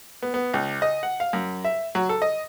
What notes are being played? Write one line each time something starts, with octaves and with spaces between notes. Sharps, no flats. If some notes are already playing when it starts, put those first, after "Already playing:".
B3
B3
C#2
D#5
F#5
F5
F#2
E5
F#3
A4
D#5